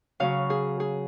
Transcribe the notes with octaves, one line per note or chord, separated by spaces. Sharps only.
C#3 F#3 C#4 F5
G#4
G#4